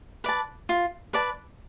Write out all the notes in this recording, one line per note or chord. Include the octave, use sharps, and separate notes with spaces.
B4 D5 A5
F4
B4 D5 A5